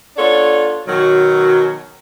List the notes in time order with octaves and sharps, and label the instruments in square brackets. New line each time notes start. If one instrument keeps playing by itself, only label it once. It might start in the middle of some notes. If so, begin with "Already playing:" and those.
[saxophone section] B3 D4 F4 A4 C#5
B2 D#3 F#3